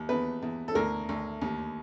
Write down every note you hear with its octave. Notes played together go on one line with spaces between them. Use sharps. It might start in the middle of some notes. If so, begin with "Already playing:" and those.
Already playing: D#2
E2 B4
E2
A4
D2 A#4
D2
D#2